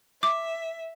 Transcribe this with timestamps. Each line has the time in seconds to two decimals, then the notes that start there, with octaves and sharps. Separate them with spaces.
0.23 E5 D6